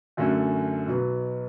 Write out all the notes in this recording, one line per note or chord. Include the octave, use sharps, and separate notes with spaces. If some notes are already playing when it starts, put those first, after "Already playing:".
F#2 D3 A3 C#4 F#4
B1 B2 F#3 B3